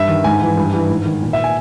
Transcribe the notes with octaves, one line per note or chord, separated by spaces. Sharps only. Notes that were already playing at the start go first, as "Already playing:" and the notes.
Already playing: G2 E5
D#3
G#2 G#5
E3
G2
E3
G#2
D#3
A#2
E5
G#5